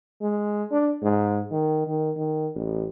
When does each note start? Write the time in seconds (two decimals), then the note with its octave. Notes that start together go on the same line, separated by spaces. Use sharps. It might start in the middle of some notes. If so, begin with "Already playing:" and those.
0.21 G#3
0.71 D4
1.02 G#2
1.51 D#3
1.87 D#3
2.17 D#3
2.55 A1